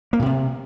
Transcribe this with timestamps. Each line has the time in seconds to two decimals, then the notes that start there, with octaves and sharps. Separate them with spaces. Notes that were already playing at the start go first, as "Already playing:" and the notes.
0.13 A#3
0.19 A#2
0.26 C3